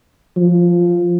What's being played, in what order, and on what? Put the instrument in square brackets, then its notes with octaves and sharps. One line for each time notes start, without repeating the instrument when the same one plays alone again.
[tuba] F3